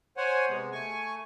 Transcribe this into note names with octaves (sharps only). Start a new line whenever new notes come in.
C5 C#5 F#5 G#5
C3 G#3 B3
A3 G#5 C#6